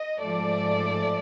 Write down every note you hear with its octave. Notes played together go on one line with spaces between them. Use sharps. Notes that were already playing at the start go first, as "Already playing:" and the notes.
Already playing: D#5
G#2 F3 A3 D5